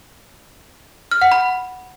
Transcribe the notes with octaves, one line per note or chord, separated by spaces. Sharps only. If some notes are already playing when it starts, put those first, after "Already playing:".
F6
F#5
B5